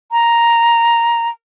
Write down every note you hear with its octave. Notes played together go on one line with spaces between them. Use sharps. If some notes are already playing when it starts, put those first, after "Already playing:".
A#5